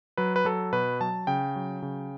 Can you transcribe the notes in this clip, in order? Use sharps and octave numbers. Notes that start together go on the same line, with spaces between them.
F#3 B4
B4
F#3 A4
B2 B4
F#3 A5
C#3 G5
F#3
C#3